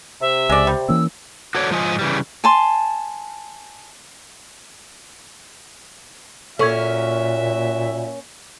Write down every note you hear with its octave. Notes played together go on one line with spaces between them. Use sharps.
C3 E5
C#2 G#3 D5
G3
E3 A#3 C#4 E6
F#4 A4 C#5 D5
G#2 F3 F4 D#5 G#5
C#3 E3 G3
G#5 A5 C6
A#2 A#3 C#4 F#4 A4 E5 C#6 G#6